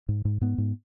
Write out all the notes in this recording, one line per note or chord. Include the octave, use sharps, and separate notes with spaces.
G#2
G#2
G#2 B3
G#2